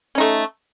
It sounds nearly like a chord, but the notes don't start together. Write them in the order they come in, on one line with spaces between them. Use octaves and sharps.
C#4 D#4 A3